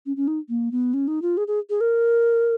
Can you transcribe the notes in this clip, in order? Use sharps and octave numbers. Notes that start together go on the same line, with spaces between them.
C#4
C#4
D#4
A#3
B3
C#4
D#4
F4
G#4
G#4
G#4
A#4